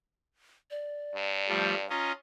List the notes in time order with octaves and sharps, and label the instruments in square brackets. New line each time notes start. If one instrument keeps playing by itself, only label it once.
[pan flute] D5
[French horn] G2
[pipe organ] F3 G3 A3
[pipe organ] C#4 F4 D#5 [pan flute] A#5